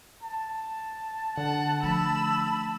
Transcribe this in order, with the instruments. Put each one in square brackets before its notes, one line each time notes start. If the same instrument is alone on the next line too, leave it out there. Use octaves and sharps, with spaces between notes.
[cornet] A5
[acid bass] D3 [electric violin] F#5
[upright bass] F3 A3 [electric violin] B5 E6